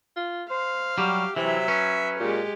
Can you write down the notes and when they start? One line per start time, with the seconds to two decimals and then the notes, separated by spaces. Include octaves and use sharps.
0.16 F4
0.50 C5 F5
0.98 F#3 G3 G4
1.36 C3 E3 F#3 E5
1.68 C#4 B4
2.20 A#2 G#3 G4